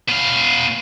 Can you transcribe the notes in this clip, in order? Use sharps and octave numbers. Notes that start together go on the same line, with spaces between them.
B2 F5